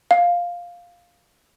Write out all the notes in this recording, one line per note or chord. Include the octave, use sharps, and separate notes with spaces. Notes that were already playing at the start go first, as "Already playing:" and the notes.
F5